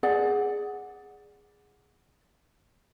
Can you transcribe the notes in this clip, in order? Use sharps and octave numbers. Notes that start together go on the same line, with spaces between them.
G#4 D5 F#5